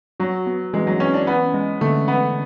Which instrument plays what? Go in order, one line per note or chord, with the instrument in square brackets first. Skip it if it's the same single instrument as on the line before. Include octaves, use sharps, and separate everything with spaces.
[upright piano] F#3 [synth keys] F#4
[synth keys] B3
[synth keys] E3 [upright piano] G#3
[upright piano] F#3
[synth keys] E3 [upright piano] C#4
[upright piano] D4
[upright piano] B3 [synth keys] C#4
[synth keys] G#3
[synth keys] D3 [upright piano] A3
[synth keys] D3 [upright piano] B3